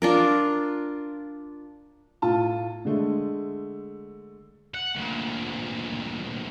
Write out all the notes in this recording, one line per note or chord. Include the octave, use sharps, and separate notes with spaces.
D4 F4 A#4
A2 F4 A5
D3 G#3 A3
F#5
D2 A#2